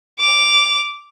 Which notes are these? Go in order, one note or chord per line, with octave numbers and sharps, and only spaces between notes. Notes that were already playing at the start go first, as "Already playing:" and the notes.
D6 F7